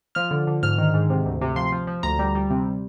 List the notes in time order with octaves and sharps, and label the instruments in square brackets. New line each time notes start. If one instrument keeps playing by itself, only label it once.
[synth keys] F3 F6
D3
D3
G#2 F6
D#3
G#2
C3
D2
C3
F3 C6
F3
F3
D2 A#5
G3
G3
C3